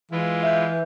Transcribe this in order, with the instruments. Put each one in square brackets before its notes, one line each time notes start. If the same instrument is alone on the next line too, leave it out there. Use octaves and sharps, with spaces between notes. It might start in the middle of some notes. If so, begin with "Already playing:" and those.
[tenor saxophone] E3 [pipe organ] G#3 E4 F4
[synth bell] E5 G6